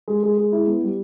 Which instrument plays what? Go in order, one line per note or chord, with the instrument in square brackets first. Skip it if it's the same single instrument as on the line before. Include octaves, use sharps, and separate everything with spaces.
[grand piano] G#3
G#3
G#3
E4
B3
G3